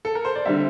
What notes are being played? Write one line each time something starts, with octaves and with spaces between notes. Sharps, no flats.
A4
A#4
C5
D5
D3 G3 C4 E5